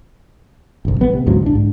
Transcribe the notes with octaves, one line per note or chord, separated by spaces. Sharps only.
G1 C2
A1 G3 B3
C3
D2 G#2 C#3 F#3
C2 D4
G#2